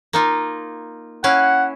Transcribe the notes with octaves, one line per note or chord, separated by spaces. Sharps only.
A#3 D#4 F4
C#4 E4 F5 F#5